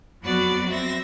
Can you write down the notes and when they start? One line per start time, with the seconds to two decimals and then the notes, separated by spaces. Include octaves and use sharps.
0.23 F2 F#3 B3 F#4 D5 B5
0.68 C4 E5 A#6